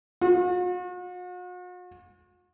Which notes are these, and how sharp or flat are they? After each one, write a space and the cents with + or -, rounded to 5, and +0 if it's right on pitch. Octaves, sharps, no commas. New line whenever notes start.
F#4 -45